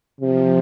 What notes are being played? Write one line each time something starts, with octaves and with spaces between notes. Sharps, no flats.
C3 F3